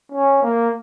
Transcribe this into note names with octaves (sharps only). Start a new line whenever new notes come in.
C#4
A#3